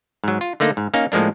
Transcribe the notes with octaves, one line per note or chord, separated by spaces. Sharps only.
G#2 F#3
F4
D3 A3 A#3 D#4
G#2
A#3 C#4 D#4 F5
A2 F3 G#3 A#3 D4